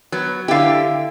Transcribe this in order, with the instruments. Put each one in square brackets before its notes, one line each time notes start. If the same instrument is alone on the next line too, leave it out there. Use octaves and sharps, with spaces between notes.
[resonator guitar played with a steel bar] F#3 B3
[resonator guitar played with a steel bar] D3 G4 [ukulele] E4 F5